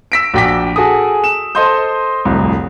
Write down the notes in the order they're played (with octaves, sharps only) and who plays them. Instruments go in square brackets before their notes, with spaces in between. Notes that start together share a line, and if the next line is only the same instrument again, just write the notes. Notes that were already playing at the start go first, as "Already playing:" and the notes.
[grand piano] E6 B6 D7
A#1 F#4 G5 D6 B6
F#4 G#4 A4 G#5 D#6
E7
A4 C5 D#5 C6 D#6 G6
D1 C2 F2